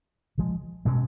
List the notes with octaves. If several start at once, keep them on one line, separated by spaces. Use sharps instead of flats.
C#3 F3 G#3
B2 G#3 C#4